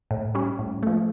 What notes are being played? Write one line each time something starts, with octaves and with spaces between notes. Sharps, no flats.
A2
G3 C#4
A2
F3 A3